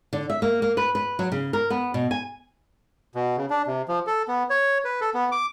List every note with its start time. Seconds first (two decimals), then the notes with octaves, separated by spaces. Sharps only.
0.13 D3
0.30 E5
0.42 A#3
0.62 A#3
0.77 B4
0.95 B4
1.19 F#3
1.32 C#3
1.53 A#4
1.70 B3
1.94 B2
2.11 G#5
3.15 B2
3.37 C#3
3.50 D4
3.67 C3
3.88 F3
4.07 A4
4.28 B3
4.50 C#5
4.85 B4
5.01 A4
5.14 B3
5.32 D6